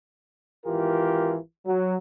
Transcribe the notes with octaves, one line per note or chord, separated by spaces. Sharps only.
G#1 E3 F4 G4 A#4
F#3